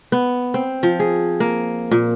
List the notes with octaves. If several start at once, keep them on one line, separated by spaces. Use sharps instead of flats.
B3
C4
F3
G#4
A#3
A#2